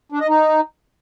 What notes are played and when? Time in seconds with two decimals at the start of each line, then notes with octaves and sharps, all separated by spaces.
0.12 D4
0.20 D#5
0.28 D#4